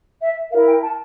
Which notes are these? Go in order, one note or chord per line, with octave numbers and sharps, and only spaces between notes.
E5
E4 A#4 F5
G5
A5